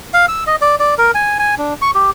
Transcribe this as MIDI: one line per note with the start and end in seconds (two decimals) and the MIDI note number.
0.14 0.26 77
0.28 0.44 88
0.47 0.56 75
0.61 0.76 74
0.79 0.95 74
0.98 1.11 70
1.15 1.38 80
1.39 1.55 80
1.58 1.74 62
1.82 1.91 85
1.95 2.10 67